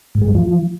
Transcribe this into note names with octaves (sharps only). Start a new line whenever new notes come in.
G#2
G#3
F#2
F3